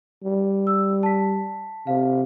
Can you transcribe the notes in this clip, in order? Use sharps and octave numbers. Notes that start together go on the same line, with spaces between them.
G3
E6
A5 B6
C3 F5